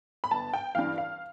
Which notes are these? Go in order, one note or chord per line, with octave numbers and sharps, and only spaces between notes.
B5
G1 A5
G5
G2 E3 F5
F5